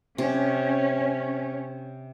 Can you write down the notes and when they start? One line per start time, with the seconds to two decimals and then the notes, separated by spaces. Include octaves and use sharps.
0.18 C3 C#4